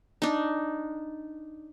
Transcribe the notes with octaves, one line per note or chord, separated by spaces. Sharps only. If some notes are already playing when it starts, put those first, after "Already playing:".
D4 D#4